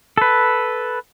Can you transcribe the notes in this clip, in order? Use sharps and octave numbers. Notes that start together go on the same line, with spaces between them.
A4 B4